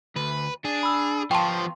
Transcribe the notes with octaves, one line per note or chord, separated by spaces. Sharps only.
D2 B4
D4 G#4
B5 E6
F3 B3 F4 F5 G5 A5 C6 C#6